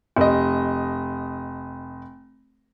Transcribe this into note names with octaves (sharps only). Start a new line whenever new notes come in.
F1 D#5